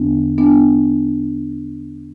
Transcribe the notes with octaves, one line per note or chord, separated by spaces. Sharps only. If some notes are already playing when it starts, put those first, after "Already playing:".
Already playing: E2 D3 B3 D4
B3 D4